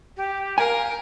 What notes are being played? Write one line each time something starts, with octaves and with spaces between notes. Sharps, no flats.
G4
A#4 F5 G#5